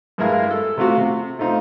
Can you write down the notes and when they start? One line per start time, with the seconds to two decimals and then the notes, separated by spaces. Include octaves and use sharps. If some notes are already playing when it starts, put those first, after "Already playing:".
0.18 G2 G#3 E4 A#4 F5
0.51 A4
0.77 C3 A3 F4 F#4
0.97 C3
1.39 A3 C4 D#4 F4